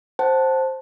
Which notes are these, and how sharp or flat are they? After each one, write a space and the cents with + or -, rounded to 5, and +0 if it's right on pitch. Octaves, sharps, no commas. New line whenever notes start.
C5 +10 F#5 +40 A5 +0